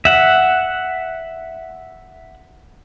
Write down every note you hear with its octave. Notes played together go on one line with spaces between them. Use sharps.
E5 F#5